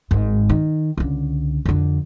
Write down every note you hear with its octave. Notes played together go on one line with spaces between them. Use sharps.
G#1 G#2
D#3
C#2 D3
F2 D3